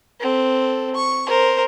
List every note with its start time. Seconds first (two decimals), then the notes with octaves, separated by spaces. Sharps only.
0.20 C4 A4
0.95 C#6
1.27 A#4 C5